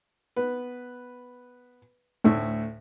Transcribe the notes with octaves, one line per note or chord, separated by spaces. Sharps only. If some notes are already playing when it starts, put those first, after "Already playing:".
B3 B4
D2 A2 A3 E5